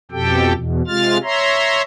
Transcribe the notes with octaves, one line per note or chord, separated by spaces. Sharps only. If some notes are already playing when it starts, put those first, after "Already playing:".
F2 B2 G4 A4 G5
E2 B2
C3 G#3 F4 F6 A6
C#5 E5 A#5 C6